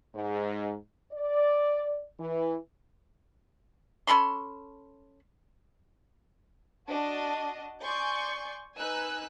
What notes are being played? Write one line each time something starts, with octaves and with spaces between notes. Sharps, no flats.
G#2
D5
E3
C#4 A4 B5 C6
D4 F#4 D#5 A5
D5 G#5 C6 C#6 G6
D#4 B4 G#5 E6 F#6